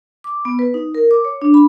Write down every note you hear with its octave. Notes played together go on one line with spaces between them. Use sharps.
D6
B3
B4
D#4
A#4
D6
C#5
D4
B5